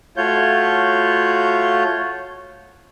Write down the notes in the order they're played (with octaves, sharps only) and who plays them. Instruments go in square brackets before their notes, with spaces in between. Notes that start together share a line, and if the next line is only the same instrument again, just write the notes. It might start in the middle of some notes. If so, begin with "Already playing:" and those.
[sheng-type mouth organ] A3 F4 F#4 C#5 G6